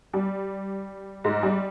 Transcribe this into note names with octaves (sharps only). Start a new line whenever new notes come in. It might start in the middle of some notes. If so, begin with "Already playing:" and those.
G3
G#2 G#3
G3